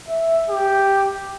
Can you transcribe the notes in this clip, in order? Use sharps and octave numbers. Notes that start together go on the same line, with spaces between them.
E5
G4